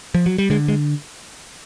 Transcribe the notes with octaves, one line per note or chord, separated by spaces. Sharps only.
F3
F#3
G3
D3 G#3
G#3